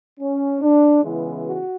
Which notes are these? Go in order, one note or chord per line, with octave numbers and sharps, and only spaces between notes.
C#4
D4
C#2 C#3 E3 G#3 B3 E4
F#4